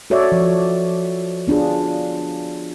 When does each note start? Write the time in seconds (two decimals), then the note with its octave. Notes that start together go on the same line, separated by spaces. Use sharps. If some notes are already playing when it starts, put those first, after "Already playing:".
0.10 F#4 A4 C#5 D5 E5
0.32 F3
1.47 B3 D4 F4 G#4